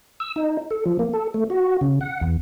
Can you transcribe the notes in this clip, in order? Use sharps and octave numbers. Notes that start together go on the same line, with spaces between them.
E6
D#4
A4
F3
A#3
A4
A3
F#4
C#3
F#5
E2